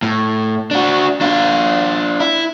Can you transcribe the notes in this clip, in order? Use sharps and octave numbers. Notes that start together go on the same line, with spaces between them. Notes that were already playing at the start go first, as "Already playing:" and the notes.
A2
D4 F#4
D4 F4
E4